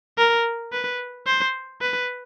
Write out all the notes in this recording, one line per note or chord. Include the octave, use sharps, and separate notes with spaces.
A#4
B4
C5
B4